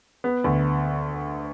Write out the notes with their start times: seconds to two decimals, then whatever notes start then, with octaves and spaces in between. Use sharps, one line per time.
0.24 B3
0.44 D2